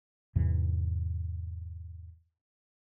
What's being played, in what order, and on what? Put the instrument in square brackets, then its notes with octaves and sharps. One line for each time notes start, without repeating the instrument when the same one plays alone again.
[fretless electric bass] E2 G#2 C3 E3